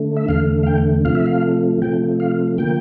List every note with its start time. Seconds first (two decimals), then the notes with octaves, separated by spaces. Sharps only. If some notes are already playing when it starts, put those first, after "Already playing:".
Already playing: D3 A3
0.17 E5
0.28 E2 D3 A3 F5
0.63 F5
0.67 G5
1.05 C3 F3 A3 F5
1.15 E5
1.26 F5
1.82 C3 F3 A3 G5
2.20 F5
2.58 D3 F3 A#3 G5